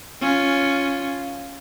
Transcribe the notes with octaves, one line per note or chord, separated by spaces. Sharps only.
C#4 F4